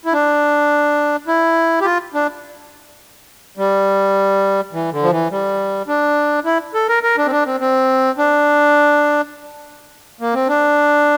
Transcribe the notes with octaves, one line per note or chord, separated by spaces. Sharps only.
E4
D4
E4
G4
F4
D4
G3
E3
D3
F3
E3
G3
D4
E4
A4
A#4
A#4
D4
C4
D4
C4
C4
D4
A#3
C4
D4